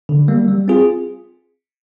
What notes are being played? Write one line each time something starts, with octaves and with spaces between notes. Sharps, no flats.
D3
G3 A#3
G3
C4 F4 G#4